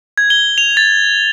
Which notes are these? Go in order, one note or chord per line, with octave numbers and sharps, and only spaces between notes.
G#6
G7
F7
A6